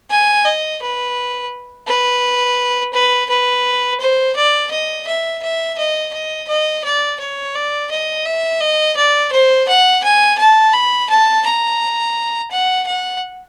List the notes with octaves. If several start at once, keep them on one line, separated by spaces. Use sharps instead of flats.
G#5
D#5
B4
B4
B4
B4
C5
D5
D#5
E5
E5
D#5
D#5
D#5
D5
C#5
D5
D#5
E5
D#5
D5
C5
F#5
G#5
A5
B5
A5
A#5
F#5
F#5